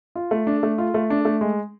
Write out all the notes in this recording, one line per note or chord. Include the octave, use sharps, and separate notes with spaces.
F4
A3
D4
A3
F4
A3
D4
A3
G#3